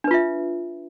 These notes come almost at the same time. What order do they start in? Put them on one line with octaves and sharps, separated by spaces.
D4 B4 F4 E5